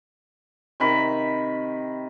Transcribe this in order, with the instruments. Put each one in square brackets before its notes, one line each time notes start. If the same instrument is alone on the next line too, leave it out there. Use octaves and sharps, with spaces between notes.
[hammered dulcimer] C3 D#3 B5 C#6